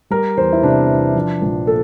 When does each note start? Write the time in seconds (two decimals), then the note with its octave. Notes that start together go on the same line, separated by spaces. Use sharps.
0.10 G3 A#4
0.37 E2 C5
0.53 E4
0.63 C3 D4
0.89 E2
1.15 F3
1.42 A#1
1.67 A#2 A4